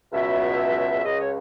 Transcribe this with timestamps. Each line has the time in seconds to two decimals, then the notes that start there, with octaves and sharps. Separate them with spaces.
0.12 C#2 B2 F#3 E5
1.03 C#2 C#3 F#3 D#5
1.19 C#5